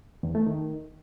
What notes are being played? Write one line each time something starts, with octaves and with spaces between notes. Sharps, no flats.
E2
A3
D#3